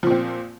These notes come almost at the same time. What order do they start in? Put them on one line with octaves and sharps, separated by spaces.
F3 A#2 C4